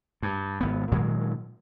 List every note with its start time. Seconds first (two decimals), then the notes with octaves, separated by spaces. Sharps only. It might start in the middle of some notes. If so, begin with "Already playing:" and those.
0.23 G2
0.61 G#1 B3
0.92 A#2 D#3 F#3 G#3